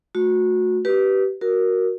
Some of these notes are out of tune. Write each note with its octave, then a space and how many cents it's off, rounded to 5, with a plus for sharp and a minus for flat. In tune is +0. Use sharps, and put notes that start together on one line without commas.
A3 +0 F#4 -25
G4 -25 B4 -15
F#4 +0 A#4 +0